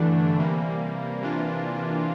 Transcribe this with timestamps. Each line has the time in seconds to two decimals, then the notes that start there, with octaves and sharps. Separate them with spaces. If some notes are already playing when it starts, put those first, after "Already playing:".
Already playing: G2 D3 E3 A3 D4
0.39 C3 G3 A#3
1.21 C3 E3 A#3 D4 F4